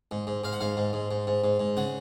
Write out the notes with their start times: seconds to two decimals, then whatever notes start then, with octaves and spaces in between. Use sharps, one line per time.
0.11 G#2
0.27 G#2
0.44 G#2 F5
0.53 F#5
0.61 G#2 F5
0.77 G#2
0.93 G#2
1.11 G#2
1.27 G#2
1.44 G#2
1.60 G#2
1.77 C#3 F#5